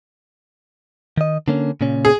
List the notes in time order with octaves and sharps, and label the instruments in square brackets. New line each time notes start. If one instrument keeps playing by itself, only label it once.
[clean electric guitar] D#3 D#5
D3 A#3 C#4
A#2 C#3 C#4
[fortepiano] G#4